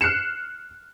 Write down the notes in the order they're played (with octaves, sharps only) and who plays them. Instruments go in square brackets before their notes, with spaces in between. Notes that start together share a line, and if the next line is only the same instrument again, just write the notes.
[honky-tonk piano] F6 F#6 C7 C#7 E7